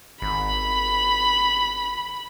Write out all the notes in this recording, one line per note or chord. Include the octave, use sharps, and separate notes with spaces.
G#1 B5